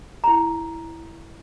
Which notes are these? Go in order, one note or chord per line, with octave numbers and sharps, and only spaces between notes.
E4 A#5